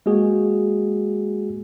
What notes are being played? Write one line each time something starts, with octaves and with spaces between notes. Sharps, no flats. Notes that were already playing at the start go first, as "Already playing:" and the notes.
G#3 A#3 F#4 G#4